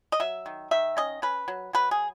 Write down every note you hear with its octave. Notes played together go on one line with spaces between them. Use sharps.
D#5
F#3 E5
D#3
D#3 E5
C#4 D#5
C#4 B4
F#3
F#3 B4
G#4